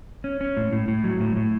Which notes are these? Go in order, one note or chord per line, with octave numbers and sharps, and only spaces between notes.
C#4
C#4
A2
A2
A2
F#3
A2
A2